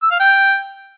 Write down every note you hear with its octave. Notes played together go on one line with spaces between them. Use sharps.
E6
F5
G5